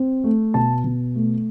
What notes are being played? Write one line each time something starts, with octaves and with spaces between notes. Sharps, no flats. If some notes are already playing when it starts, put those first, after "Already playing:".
Already playing: C4
A3
B2 A5
B2
A3